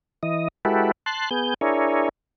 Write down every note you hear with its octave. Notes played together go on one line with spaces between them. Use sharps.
E3 D#5
G#3 E4 F#4 G4 A4 B4
A5 C6 F#6
B3 G#4 G6
D4 E4 G#4 A#4 C#5